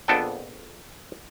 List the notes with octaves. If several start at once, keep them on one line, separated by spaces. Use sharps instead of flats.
A#1 F2 B3 D4 A4 G5